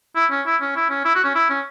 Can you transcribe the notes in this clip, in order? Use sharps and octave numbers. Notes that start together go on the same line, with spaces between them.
E4
C#4
E4
C#4
E4
C#4
E4
F#4
C#4
E4
C#4